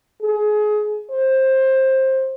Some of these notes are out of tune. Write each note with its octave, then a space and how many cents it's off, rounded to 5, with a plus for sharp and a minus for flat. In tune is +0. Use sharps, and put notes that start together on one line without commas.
G#4 +25
C5 +15